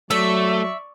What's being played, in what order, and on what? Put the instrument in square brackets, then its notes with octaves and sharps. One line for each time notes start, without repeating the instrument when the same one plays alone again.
[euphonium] F#3 [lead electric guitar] A3 [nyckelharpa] D5 C#6 [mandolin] E5